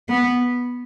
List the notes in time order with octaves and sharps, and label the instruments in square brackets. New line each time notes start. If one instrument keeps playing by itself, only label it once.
[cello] B3